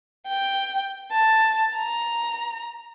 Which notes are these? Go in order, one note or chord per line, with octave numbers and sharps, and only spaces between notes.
G5
A5
A#5